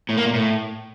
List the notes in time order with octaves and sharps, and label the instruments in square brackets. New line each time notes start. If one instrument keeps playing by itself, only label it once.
[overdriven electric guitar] A2
A#3
A#2
A2